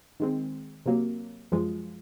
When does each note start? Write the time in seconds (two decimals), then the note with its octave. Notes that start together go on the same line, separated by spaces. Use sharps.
0.20 D#3 G#3 C4
0.86 C3 F#3 A#3
1.52 F#2 F3 G#3